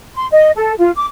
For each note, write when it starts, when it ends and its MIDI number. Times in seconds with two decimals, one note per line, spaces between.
0.15 0.26 84
0.30 0.50 75
0.55 0.73 69
0.79 0.91 65
0.95 1.05 86